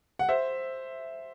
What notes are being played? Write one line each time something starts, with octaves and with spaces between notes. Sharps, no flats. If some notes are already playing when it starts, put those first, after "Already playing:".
F#5
C5 E5